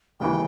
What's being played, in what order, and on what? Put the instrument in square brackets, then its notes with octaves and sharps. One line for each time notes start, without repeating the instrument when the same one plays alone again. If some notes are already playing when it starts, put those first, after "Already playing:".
[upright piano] E1 D#2 C#3 E3 [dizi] G5